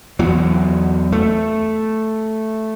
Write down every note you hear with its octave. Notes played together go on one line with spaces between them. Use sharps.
E2 F#3
A3